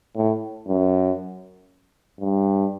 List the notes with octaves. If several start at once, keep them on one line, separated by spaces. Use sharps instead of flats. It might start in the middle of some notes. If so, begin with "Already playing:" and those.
A2
F#2
G2